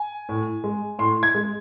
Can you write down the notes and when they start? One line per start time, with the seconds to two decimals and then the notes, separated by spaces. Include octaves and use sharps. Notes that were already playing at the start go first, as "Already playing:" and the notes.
Already playing: G#5
0.29 A2
0.64 G#3
0.99 A2 C6
1.23 G#6
1.35 G#3